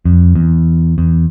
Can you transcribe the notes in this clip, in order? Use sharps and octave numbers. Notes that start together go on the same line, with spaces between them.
F2
E2
E2